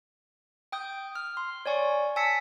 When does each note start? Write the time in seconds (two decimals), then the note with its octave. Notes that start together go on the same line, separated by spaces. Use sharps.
0.72 G5 D#6 G6
1.15 F6
1.37 C6
1.66 C#5 D5 G#5 C#6
2.16 G#5 A5 E6 B6 C#7